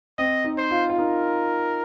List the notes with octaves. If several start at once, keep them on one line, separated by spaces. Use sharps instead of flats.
C4 D#5
D#4
C5
F4
F4
D#4 A#4